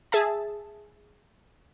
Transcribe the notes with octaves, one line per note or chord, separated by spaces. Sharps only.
G#4 E5 A5